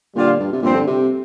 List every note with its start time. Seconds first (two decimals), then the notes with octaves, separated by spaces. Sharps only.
0.16 A#2 D3 G3 D4 F4
0.40 G2
0.53 C3
0.62 G2 A#2 F3 C4
0.75 D3
0.87 C3